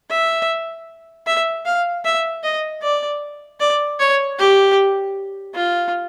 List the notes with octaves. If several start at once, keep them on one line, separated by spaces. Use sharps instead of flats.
E5
E5
F5
E5
D#5
D5
D5
C#5
G4
F4